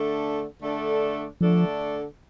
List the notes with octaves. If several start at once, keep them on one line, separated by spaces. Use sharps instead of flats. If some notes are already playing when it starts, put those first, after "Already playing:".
Already playing: D3 A3 D4 A4
D3 A3 D4 A4
D3 F3 A3 D4 A4